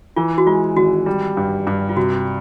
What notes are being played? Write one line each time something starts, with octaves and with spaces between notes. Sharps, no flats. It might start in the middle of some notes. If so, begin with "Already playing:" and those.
E3 F4
F#4
G#3 F4
G#1 F#4
G3
G2
G2
F4
C3 F#4